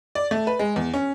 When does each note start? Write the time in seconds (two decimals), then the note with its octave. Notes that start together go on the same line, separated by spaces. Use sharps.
0.15 D5
0.31 A3
0.47 B4
0.59 G#3
0.76 E2
0.94 C#4